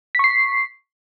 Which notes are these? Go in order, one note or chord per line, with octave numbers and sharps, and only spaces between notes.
C#6 B6 C7